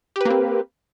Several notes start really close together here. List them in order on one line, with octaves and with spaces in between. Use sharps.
G4 B4 A#3 C4